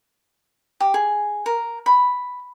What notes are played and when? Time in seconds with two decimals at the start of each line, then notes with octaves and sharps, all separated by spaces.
0.80 G4
0.94 G#4
1.46 A#4
1.86 B5